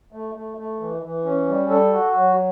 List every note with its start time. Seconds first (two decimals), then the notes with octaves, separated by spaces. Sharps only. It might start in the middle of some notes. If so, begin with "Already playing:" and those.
0.12 A3
0.35 A3
0.58 A3
0.80 E3
1.03 E3
1.25 C#4
1.47 G3
1.70 A4
1.93 F#4
2.15 F#3